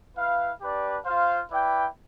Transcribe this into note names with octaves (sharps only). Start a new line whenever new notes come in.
E4 B4 F5
D4 G4 B4 D5
F4 C5 F5
E4 B4 D5 G5